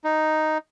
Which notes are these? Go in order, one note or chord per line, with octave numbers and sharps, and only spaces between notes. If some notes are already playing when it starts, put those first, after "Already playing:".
D#4